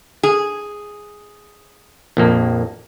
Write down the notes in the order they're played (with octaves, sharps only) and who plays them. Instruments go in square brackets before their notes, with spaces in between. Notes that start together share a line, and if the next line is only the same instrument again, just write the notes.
[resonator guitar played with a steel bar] G#4
[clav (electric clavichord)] A#1 F2 A#3